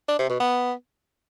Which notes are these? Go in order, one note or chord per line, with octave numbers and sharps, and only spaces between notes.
D4
C3
B2
B3